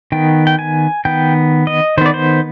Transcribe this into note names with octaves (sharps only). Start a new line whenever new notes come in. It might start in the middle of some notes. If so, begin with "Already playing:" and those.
D#3 B3 G5
G5
G#5
D#3 B3 G5
D#5
D#3 B3 C5 D5
C5